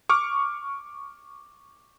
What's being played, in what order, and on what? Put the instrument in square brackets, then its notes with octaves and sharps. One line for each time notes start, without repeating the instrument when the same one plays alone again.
[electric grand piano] C#6 D6 F6